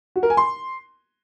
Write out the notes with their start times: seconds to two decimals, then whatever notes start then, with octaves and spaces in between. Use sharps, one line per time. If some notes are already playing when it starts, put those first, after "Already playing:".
0.16 F#4
0.23 A#4
0.30 G#5
0.37 C6